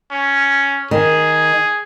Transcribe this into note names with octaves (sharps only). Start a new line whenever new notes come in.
C#4
D#3 G#4